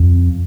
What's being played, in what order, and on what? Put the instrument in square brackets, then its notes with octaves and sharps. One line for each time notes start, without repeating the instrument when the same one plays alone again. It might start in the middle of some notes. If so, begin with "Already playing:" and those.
Already playing: [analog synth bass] F2